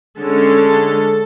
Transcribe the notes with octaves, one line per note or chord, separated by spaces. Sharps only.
D3 G#3 C#4 A4